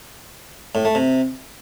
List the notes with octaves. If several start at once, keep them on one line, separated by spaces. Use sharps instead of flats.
A2
A3
C3